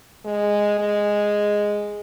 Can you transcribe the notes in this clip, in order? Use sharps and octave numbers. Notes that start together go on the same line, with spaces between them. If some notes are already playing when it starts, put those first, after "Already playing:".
G#3
G#3